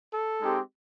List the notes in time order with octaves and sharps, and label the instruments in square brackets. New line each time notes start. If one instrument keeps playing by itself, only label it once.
[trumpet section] A4
G#3 C4 D#4 G4